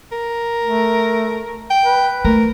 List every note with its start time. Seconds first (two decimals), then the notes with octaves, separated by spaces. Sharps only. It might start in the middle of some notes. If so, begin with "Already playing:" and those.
0.12 A#4
0.63 A3
1.70 G5
1.85 B4
2.25 A3 A#4